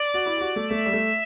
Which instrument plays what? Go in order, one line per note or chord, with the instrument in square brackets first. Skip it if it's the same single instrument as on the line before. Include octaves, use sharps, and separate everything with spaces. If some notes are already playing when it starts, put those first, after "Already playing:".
Already playing: [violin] D5
[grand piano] F#4
E4
G4
F#4
A3
[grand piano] A3 [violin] E5
[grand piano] G3
A3